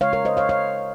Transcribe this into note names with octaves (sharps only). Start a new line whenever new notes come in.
C#3 G#3 C#5 F5
A#4 C#5
C5 D#5
C#5 F5
C#5 F5